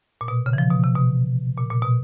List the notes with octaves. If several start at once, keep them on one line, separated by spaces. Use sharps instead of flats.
A#2
B2
C#3
E3
F3
B2
C3
B2
A#2
A#2
B2